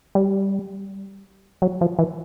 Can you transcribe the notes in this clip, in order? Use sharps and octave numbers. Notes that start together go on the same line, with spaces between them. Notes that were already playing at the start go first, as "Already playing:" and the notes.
G3
F#3
F3
E3